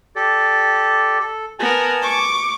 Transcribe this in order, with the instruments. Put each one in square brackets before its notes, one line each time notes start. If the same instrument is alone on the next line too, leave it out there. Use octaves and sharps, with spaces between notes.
[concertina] G4 A4 D5
A4
[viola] B3 A#4 [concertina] G#5 A5
[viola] C#6 D6